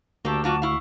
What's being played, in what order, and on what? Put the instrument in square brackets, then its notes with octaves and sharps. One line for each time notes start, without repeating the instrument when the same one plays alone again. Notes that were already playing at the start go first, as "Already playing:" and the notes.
[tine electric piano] D2 [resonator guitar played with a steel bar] A#3 G4 [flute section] A5 C#6 E6
[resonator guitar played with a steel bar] F#3 F4 F#4 [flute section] A5 D6
[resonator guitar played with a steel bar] E4 F5 [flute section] C#6